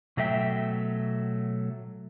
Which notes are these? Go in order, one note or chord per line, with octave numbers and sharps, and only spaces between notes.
B2 F#3 A3 E5 G5